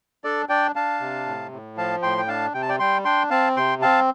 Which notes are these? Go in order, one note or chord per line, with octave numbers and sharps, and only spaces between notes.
D4 A4 D5
D4 D5 G5
D4 F5 A5
C3
A2
A2
F3 F5 A5
A2 G5 C6
G5
D4 F5 A5
C3 G5
A5
D5 G5
G3 G5 C6
D4 G5 C6
C4 F5 A5
C3 G5 C6
C4 F5 A5